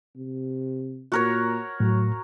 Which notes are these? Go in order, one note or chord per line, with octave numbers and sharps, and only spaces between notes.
C3
A#2 F#4 A#4 C#5
A2 F#3